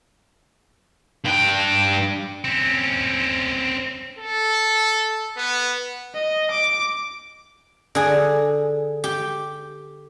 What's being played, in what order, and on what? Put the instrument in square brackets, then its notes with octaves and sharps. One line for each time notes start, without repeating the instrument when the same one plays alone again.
[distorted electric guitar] G2 G5
C4 C#4
[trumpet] A4
B3
[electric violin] D#5
D6
[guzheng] D3 G#4
G4